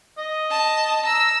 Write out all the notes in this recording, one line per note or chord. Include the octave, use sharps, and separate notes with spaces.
D#5
A5
A#5 E6